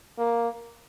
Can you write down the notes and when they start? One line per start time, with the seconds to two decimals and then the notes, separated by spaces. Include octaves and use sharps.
0.18 A#3